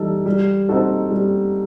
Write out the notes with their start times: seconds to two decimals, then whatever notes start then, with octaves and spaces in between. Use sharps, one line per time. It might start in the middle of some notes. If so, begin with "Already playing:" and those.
Already playing: E3 G3 D#4 A4
0.26 G3
0.69 C4 D#4 F#4 A4
1.11 G3